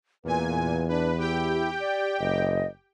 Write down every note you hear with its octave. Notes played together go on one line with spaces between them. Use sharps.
E2 A#2 B4 G#5
D4 B4
E4 G4 G5
D5
F#1 D#5